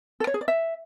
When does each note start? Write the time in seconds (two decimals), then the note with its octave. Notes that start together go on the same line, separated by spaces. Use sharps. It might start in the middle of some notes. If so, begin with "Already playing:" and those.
0.20 A4
0.27 C#5
0.34 G#4
0.41 D5
0.48 E5